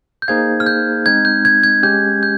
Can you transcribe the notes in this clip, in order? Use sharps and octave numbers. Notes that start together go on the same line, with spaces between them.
G6
A#3 D#4 G#4 C5 F5 G#6
F6
G6
G#3 C4 D#4 G#6
G6
G#6
G#6
G#3 C#4 G4 G6
G6